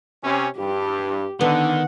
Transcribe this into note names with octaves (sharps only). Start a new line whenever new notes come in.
C3 C#4
G2 G4
D3 D#3 B3 F#5